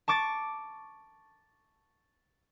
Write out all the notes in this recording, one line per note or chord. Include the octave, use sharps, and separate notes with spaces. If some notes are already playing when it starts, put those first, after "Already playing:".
A5 C#6 D6 A6